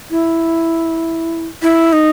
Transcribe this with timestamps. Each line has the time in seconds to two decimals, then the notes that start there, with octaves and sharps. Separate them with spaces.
0.11 E4
1.63 E4
1.93 D#4